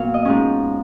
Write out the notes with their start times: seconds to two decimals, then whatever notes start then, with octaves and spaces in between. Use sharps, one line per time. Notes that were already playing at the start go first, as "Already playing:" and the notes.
Already playing: A#2 F#3 B3 F5
0.14 D#5
0.25 G#2 F3 G#3 C#4 D#5